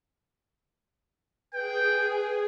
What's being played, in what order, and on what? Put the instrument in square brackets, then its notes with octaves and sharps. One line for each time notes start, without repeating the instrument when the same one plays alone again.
[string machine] G#4 [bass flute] B4 [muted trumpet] G5